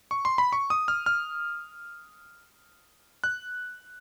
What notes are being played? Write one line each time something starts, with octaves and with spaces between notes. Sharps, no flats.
C#6
C6
B5
C#6
D#6
F6
F6
F#6